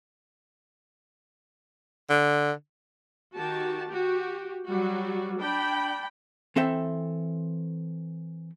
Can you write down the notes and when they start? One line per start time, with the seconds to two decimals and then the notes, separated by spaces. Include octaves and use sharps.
2.10 D3
3.35 D#3 F#4 G4 A5
3.87 F#4 G4
4.66 F#3 G3 F#4
5.40 D4 G5 B5
6.56 E3 C4 A4 E5 G5